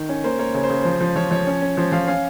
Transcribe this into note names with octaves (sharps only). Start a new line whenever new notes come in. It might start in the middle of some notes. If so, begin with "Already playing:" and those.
Already playing: D#3
C#4
A#3 C5
A#3 C#5
C#3 C#5
C5
C#3
F3 C5
F3
F3 C#5
F3 C#5
C#4
C#4
F3 C5
F3 F5
C#4 F5